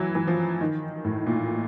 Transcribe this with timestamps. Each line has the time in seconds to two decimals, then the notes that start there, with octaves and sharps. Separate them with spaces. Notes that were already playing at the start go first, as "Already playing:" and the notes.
Already playing: E3 F#3
0.15 E3
0.27 F3
0.61 D#3
1.05 A2
1.27 A#2